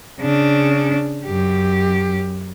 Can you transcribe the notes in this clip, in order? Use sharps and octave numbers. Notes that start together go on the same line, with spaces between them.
C#3 D4
F#2 G4